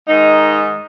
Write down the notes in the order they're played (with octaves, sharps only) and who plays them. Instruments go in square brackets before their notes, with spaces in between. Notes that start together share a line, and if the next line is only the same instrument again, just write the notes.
[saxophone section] G#2 D#3 G#3 D#4